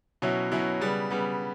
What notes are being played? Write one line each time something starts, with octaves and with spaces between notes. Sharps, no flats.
B2 F#3 C#4 E4
B2 F#3 C#4 E4
C#3 G3 B3
C#3 G3 B3